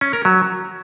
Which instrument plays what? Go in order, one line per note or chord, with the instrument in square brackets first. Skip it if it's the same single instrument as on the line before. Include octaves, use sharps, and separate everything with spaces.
[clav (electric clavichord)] C#4
A#4
F#3